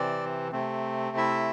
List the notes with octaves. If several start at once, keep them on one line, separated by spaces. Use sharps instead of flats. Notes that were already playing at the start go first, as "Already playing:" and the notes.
Already playing: C3 E3 C4 D5
C3 A3 C4
E4 E5